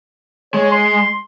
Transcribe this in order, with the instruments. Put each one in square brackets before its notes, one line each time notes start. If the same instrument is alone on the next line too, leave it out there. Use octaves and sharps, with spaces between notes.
[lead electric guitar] G#3 [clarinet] C#5
[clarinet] C6